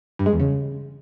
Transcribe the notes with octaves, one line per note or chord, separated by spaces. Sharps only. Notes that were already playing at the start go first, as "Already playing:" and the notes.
G2
G#3
E2
C#3